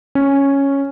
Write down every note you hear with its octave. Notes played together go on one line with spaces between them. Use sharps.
C#4